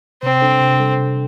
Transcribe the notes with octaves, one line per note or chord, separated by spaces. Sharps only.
C3 C4
G3 D4 A4
C3
G3 D4 A4
C3